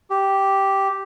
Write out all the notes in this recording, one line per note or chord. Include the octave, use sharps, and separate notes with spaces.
G4